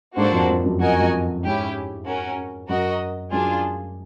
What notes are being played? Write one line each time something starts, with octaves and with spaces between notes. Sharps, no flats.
G#2 A#3 D4 F#4 A4 C5
F2
F2
F#2
F2 F#4 A#4 D#5 G#5
F2
G#2 C#4 E4 G4
C#4 F#4 A#4
F#2 F#4 A#4 D#5
F#2 D4 F4 G#4